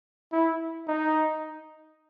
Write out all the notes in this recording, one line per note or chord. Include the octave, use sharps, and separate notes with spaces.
E4
D#4